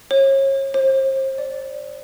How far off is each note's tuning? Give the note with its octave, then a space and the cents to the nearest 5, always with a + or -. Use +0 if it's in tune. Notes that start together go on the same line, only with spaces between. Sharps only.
C#5 -30
C5 +35
D5 +0